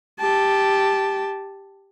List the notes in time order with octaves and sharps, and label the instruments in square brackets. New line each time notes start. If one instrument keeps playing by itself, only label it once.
[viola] G4 A5